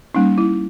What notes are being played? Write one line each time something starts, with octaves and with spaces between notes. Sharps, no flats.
G3 A#3 C#4 D#4
E4